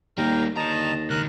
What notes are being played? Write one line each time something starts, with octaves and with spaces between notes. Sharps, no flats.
D#2 G3 A#3 A#4 G5 A#5
D#2 D3 D#5 A5 A#5
C#2 D#3 A#4 F#6